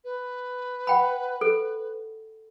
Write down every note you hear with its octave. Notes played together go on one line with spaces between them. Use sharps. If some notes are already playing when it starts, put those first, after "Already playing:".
B4
F#5 G5 B5
A4